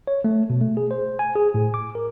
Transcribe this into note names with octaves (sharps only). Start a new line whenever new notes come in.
C#5
A3
B2
A3
G#4
C5
G#5
G#4
A2
D6
A#4